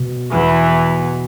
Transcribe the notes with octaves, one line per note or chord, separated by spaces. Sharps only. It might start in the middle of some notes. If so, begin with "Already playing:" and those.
Already playing: B2
E2 E3